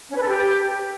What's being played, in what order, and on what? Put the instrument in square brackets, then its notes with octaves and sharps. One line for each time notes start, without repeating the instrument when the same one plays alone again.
[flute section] C#4
B4
A4
G4